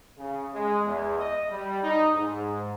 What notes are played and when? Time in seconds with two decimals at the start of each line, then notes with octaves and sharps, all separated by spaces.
0.18 C#3
0.53 G#3
0.85 E2
1.19 D#5
1.50 G3
1.83 D#4
2.16 G#2